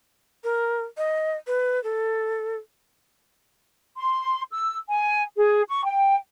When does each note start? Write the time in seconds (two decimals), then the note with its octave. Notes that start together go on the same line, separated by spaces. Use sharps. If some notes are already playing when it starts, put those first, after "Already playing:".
0.44 A#4
0.97 D#5
1.47 B4
1.83 A4
3.95 C6
4.51 E6
4.89 G#5
5.35 G#4
5.67 C#6
5.84 G5